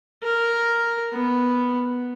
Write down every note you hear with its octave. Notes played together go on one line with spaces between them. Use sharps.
A#4
B3